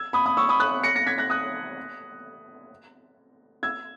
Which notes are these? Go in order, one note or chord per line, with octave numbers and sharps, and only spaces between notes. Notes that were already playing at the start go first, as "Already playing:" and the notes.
Already playing: E6 G#6
B5 D#6
B5 D#6
C#6 E6
B5 D#6
D#6 F#6
A#6 C#7
A#6 C#7
G#6 B6
F#6 A#6
D#6 F#6
E6 G#6